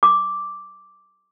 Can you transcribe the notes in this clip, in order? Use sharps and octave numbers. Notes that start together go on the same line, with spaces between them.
D6